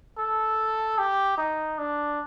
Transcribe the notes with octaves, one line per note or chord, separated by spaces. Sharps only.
A4
G4
D#4
D4